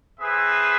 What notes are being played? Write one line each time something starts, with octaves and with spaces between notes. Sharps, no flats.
C4 G#4 B4 E5